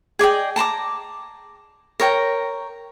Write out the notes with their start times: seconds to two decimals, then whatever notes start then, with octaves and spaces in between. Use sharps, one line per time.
0.19 G#4 D5 D#5 G5
0.56 A5 A#5 C6 D6
2.00 A#4 C#5 G5 A#5